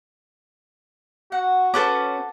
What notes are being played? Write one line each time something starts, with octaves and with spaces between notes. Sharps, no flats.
F#4 F#5
C#4 A4 B4 C5 F#5 D6